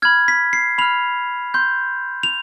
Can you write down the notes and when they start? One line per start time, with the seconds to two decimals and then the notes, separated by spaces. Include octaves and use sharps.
0.02 B5 F6 G#6
0.28 B6
0.53 C7
0.78 B5 F6 F7
1.54 C6 G6
2.23 F7